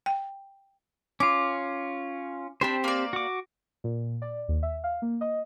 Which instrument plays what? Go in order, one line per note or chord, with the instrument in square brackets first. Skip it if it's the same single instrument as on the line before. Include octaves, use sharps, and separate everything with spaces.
[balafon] G5
[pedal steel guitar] C#4 F4 [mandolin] D6
[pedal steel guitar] C4 G4 C5 [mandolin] D4 B5
[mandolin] A#3 D5
[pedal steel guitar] F#4 D6
[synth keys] A#2
D5
D#2
E5
F5
A#3
D#5